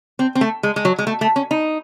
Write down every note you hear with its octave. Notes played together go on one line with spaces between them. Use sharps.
C4
C4
A3
G#3
G#3
F#3
G#3
A3
A3
C#4
D#4